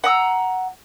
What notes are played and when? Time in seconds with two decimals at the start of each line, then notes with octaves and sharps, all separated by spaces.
0.04 F#5 A#5 D#6 E6